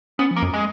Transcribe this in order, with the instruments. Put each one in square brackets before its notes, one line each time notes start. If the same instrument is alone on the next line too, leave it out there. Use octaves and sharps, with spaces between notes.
[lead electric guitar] B3 [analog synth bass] C#4
[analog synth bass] F3
[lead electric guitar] A#3
[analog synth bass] F#2
[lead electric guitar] G#3